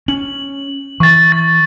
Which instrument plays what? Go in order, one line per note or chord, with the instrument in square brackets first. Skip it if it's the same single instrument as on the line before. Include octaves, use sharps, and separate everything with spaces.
[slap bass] C#4 [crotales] F#7
[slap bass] E3 [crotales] C#6 A6
[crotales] A6